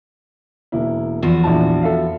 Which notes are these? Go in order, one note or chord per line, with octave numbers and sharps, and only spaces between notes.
E1 A#3 E4
E2 F3 F#4
A#1 E4 A5
A4 E5 F5